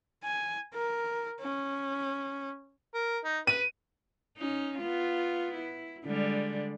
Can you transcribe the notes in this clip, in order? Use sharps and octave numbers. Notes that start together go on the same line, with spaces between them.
G#5
A#4
C#4
A#4
D#4
B4 D#7
C#4 D#4
B3 F4
E4
D3 G3 G#3